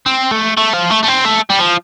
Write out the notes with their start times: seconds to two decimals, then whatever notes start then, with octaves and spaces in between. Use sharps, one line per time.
0.06 C4
0.31 A3
0.57 A3
0.73 F3
0.90 A3
1.03 A3
1.08 C4
1.25 A3
1.50 G3
1.58 F3